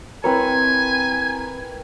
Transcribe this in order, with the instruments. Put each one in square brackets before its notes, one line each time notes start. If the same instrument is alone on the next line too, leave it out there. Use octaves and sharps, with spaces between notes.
[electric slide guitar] C4 E4 C#5 [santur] A#4 B4 G5 [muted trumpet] G#5